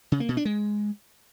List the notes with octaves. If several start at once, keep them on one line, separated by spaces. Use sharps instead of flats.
C#3
A#3
B2
D4
G#3